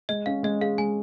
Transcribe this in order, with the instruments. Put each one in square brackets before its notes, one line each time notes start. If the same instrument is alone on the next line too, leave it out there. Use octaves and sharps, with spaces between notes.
[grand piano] G#3 [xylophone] D#5
[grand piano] C#4 [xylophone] F5
[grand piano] G#3 [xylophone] D#5
[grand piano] G#4 [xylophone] F5
[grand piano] G#3 [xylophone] G#5